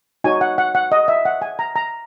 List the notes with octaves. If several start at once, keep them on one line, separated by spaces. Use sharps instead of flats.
D#4 F#4 C#5 G#5
F#5
F#5
F#5
D#5
E5
F#5
G#5
A#5
A#5